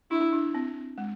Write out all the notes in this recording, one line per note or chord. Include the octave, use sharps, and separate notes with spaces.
D4 E4
D4
C4
G#3